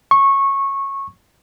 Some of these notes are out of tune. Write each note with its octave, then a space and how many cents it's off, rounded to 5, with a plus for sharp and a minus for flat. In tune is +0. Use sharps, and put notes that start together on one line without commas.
C#6 -15